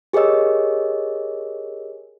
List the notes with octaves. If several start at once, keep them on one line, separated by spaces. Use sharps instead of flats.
G4 G#4 A#4 C#5 D#5 E6